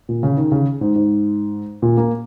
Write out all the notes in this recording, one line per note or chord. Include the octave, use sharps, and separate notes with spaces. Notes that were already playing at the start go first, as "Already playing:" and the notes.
A#2
C#3
D#3
C#3
G#2
G#2
A#2
A#3